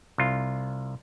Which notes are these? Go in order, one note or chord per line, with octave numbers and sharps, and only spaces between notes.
C2 F4